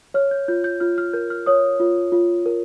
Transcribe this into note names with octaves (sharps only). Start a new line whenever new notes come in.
C#5 F6
G6
F4 G6
G6
F4 F6
F6
A#4 G6
F6
C#5 D#6
F4
F4
A#4